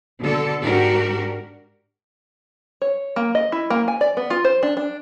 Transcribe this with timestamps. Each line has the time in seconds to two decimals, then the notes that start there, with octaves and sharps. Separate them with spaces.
0.21 B2 D3 A4
0.62 G#2 D4 F#4 G4 A#4
2.82 C#5
3.16 A#3
3.35 D#5
3.52 E4
3.70 A#3
3.88 G#5
4.01 D5
4.17 B3
4.30 F4
4.45 C5
4.63 D4
4.77 D4